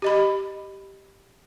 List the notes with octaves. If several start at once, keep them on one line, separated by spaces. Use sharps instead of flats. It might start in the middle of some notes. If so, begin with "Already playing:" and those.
G4 D#5 B5